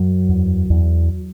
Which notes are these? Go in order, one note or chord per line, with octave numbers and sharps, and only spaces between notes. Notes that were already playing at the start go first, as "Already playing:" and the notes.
Already playing: F#2 F#3
E2
E2